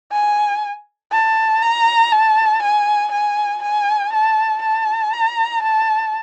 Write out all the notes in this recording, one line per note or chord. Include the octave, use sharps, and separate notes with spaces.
G#5
A5
A#5
A5
G#5
G#5
G#5
A5
A5
A#5
A5